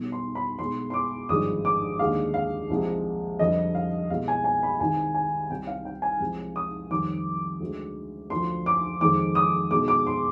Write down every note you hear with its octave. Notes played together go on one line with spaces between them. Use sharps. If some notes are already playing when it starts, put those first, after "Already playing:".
Already playing: B1 B2 G3
C6
B5
B1 B2 G#3 C6
C6
D6
G#1 G2 D3 F3 G#3 D#6
D6
D#2 D3 G#3 F5
F5
C2 C3 F3 G#3
F2 D3 G3 D#5
F5
C2 B2 G#3 F5
G#5
G#5
B5
C2 C3 D#3 G#3 G#5
G#5
C2 C3 G3 G5
F5
G5
G#5
C2 C3 F3 G#3
D#6
F2 D#3 G3 D6
D2 D3 G#3
D2 D3 F3 C6
D6
F2 D#3 G#3 D6
D#6
B1 B2 G#3 D6
D6
C6